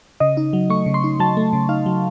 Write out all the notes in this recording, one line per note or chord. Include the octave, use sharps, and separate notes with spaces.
C#3 D#5
D#4
F#3
A3 C#6
C#3
C6
D#4
F#3 A5
A3
C#3
D#4 F5
F#3